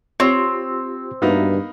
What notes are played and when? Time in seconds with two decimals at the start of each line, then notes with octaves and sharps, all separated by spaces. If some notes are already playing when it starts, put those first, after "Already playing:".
0.20 C4 F4 G4 C#5
1.22 G2 A#3 B3 D#4 F#4 B4 E5